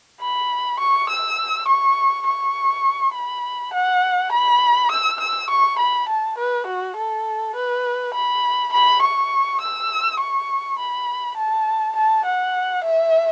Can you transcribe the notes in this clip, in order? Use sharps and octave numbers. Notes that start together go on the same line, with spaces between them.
B5
C#6
E6
C#6
C#6
B5
F#5
B5
E6
E6
C#6
B5
A5
B4
F#4
A4
B4
B5
B5
C#6
E6
C#6
B5
A5
A5
F#5
E5